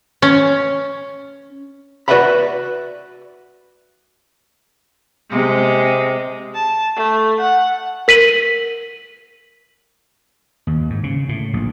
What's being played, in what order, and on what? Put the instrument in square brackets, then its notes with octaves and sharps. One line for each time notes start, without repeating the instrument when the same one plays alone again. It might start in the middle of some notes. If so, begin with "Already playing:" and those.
[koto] C#4
[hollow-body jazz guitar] F#4 B4 D5 E5 F#5 B5
[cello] C3 G#3
[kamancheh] A5
A3
F#5
[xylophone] A#4 B6 D#7 F#7
[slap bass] D#2
G#2
C#3
A2
A#1